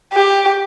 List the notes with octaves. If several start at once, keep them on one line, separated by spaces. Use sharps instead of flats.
G4